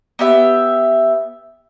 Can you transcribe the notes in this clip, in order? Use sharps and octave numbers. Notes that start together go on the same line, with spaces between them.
B3 G4 E5